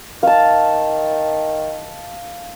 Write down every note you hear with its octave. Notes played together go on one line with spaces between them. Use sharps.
D#3 F5 A5